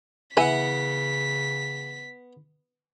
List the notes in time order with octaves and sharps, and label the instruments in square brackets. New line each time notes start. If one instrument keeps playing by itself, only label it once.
[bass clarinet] C#3 [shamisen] E3 E5 G#5 [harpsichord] B3 F#5 [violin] B6